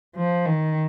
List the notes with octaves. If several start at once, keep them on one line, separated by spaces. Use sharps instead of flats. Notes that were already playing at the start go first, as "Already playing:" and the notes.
F3
D#3